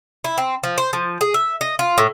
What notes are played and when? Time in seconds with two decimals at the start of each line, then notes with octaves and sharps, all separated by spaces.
0.25 E4
0.38 C4
0.64 F3
0.78 C5
0.93 F3
1.21 G#4
1.34 E5
1.61 D#5
1.79 F4
1.98 A2